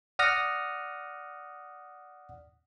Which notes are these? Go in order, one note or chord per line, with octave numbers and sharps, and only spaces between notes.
D5 F#5 D#6 F6 A#6